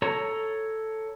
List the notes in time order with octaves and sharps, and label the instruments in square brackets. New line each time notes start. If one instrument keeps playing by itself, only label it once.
[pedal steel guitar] A4 C#5 A#5